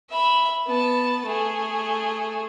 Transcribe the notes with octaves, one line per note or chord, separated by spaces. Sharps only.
E5 B5
B3 A5
A3 G#4